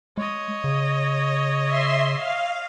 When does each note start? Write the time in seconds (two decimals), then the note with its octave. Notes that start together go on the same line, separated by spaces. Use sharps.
0.18 G#3 C#5 D#5
0.64 C#3
1.66 E5 C6
2.16 F5